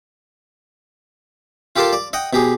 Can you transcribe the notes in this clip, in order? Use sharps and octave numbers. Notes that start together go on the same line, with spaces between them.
F4 G4 A4 A#4 A5 C6
D5
D#5 F#5 G5
B2 G4 G#4